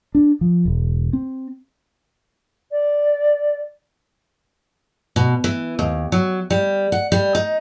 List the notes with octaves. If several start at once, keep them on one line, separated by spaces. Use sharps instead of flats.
D4
F3
E1
C4
D5
B2
E3
D#2
F#3
G3
F#5
G3
D#4